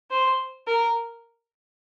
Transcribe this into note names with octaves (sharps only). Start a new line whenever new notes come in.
C5
A#4